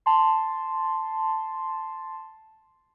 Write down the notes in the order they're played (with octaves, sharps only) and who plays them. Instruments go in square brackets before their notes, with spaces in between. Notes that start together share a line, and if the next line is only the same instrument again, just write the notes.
[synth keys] A5 C6